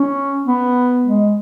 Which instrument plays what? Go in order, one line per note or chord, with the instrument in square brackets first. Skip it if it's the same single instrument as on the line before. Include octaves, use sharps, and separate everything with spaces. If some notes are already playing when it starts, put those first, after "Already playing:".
Already playing: [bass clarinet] C#4
B3
G#3